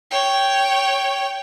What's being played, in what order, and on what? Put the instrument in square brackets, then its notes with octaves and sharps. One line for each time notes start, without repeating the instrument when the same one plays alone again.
[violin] C#5 G5